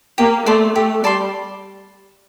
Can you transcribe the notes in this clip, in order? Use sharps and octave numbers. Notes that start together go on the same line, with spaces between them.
A#3 G4
A3 D5 A5 C6
A3 G4
G3 D5 A5 C6